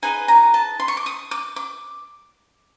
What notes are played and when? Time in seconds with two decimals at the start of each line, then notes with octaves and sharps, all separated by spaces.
0.02 D#4 G#4 B4 D#5 G#5
0.28 A#5
0.54 A5
0.80 C6
0.88 C#6
0.97 D6
1.06 D#6
1.31 D6
1.56 D6